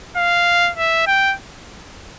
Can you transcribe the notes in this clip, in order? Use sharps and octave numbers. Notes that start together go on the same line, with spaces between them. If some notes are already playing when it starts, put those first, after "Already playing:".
F5
E5
G5